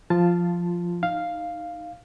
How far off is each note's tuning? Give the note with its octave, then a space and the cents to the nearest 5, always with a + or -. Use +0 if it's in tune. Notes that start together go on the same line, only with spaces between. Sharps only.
F3 +0 F4 -10 A5 +0
D#4 +0 F5 +0